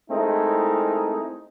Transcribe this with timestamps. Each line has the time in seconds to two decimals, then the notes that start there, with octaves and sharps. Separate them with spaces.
0.10 G#3 A3 C4 D#4 E4 A#4